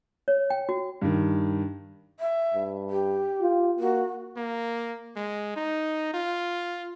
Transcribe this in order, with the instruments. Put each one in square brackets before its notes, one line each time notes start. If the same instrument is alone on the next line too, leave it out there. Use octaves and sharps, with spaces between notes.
[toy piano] C#5
G5
F#4
[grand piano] G2 D#3
[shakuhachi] E5
[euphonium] G2
[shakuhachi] G4
[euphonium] F4
[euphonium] A#3 [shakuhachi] F#4
[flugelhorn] A#3
G#3
D#4
F4